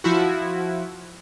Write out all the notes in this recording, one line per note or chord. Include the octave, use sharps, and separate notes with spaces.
F3 E4 F#4